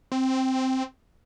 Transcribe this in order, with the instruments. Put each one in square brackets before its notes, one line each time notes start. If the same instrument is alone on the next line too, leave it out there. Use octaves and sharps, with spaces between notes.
[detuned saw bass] C4